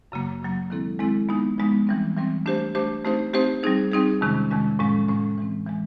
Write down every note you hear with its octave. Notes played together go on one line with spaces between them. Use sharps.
F#2 C#3 F#3 A#3
F#2 C#3 F#3 A#3
D#3 G#3 C4 E4 A4
D#3 G#3 C4 E4 A4
F3 G#3 B3 D#4
F3 G#3 B3 D#4
E3 G3 C4
E3 G3 C4
A3 D4 G4 C5
A3 D4 G4 C5
A3 C4 D#4 G4 C5
A3 C4 D#4 G4 C5
G3 C4 D#4 G#4
G3 C4 D#4 G#4
F2 C3 D#3 G#3 C#4
F2 C3 D#3 G#3 C#4
A2 F3 G#3 C#4
A2 F3 G#3 C#4
E3 G#3 C4
E3 G#3